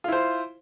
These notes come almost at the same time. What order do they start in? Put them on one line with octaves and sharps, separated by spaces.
F4 E4 C5